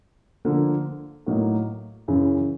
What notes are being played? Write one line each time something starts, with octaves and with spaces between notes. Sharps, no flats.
D3 F3 A#3
A2 F#3 A#3 D#4
F#2 C#3 E3